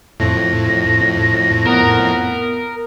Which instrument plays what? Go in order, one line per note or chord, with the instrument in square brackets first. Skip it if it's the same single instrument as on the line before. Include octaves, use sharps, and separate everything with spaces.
[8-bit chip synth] F2 A2 [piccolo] A#6
[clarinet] B3 [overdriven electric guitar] A#4